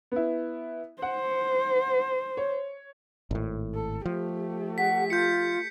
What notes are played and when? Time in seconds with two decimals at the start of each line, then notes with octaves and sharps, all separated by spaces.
0.12 B3 E4
1.02 C5 F#5
2.37 C#5
3.31 G#1 A2
3.74 A4
4.05 F3 A3 G4
4.78 F#5 B6
5.10 F4 G6 C#7